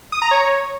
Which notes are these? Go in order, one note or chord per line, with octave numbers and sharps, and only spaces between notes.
D#6
A#5
C#5